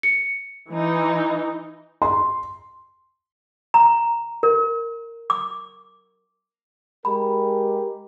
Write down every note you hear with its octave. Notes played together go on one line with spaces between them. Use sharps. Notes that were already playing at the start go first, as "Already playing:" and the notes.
C#7
E3 D#4
C6
A#5
A#4
D6
G#3 G4 A#4 B5